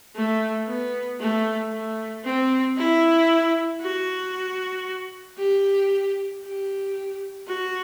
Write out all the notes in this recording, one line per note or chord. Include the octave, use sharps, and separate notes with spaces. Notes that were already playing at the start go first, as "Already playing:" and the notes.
A3
B3
A3
A3
C4
E4
F#4
G4
G4
F#4